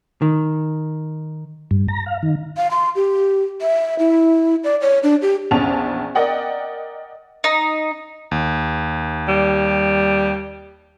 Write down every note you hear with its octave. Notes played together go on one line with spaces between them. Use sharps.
D#3
G2
A#5
F5
D#3
F5
C6
G4
E5
E4
D5
C#5
D4
G4
A#1 E2 C#4 A5 F7
A#4 D5 D#5 F#5 G5
D#4
D#2
G3